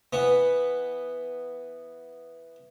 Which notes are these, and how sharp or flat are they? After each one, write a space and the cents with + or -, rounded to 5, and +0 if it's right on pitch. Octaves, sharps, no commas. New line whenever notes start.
E3 +0 B3 +0